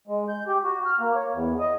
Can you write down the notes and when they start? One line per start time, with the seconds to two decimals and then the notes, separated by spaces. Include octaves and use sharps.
0.07 G#3
0.29 G6
0.47 G4
0.63 F#4
0.86 F6
0.99 A#3
1.15 C#5
1.32 E2
1.59 D#5